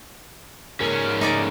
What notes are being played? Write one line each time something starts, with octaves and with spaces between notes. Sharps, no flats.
G#2 C#4 A#4
A3 D#4 D5 D6